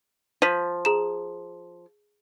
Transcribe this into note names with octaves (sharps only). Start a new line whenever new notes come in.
F3 B6 D#7
G#4 A#5 E7